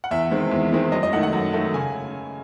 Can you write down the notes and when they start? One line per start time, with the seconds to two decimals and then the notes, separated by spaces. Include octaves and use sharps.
0.04 F#5
0.11 E2 E5
0.31 D#3 G#3 C4
0.51 E2
0.72 D#3 G#3 C4
0.92 F#2 D#5
1.03 D#5
1.12 A3 F#5
1.16 D#3
1.23 F#5
1.33 F#2
1.53 D#3 A3
1.73 C#3 G#5